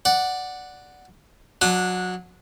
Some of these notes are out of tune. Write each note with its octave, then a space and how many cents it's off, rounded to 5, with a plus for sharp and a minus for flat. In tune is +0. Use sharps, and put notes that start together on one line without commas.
D5 +0 F#5 +0
F#3 -20 D4 +0 D#6 -40